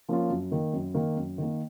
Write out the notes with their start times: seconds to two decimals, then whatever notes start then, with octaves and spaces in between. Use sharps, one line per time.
0.09 F3 A#3 C#4 F4
0.30 F#2
0.51 D#3 A#3
0.73 F#2
0.94 D#3 A#3
1.17 F#2
1.38 D#3 A#3